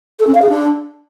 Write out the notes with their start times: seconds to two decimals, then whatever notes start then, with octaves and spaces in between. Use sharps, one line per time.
0.20 A4
0.27 C#4
0.35 F5
0.42 G#4
0.49 D4